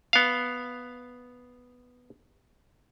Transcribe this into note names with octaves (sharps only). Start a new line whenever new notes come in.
B3 F5